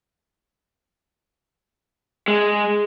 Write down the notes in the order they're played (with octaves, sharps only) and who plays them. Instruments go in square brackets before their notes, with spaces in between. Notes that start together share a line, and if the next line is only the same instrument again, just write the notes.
[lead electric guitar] G#3